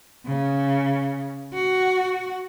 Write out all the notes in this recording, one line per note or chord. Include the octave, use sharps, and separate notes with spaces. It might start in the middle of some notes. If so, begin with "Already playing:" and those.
C#3
F#4